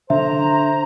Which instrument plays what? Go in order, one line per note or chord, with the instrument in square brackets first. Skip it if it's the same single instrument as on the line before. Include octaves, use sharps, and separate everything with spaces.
[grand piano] D3 [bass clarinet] C5 [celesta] E5 [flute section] A#5